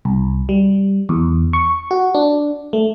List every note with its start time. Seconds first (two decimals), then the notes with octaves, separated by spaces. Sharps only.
0.05 C2
0.49 G3
1.09 E2
1.53 C#6
1.91 F#4
2.15 D4
2.73 A3